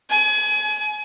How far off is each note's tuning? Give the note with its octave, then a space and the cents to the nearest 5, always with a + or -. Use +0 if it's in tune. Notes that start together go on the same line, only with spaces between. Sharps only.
G#5 +30